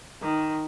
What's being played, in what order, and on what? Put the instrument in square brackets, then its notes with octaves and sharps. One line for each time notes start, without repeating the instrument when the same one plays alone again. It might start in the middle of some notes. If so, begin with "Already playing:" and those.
[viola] D#3